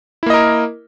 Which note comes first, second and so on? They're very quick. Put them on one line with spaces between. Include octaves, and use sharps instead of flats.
E4 A#3 D#5 A#4